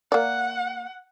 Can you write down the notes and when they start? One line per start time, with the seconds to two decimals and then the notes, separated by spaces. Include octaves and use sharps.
0.12 A#3 D5 F#5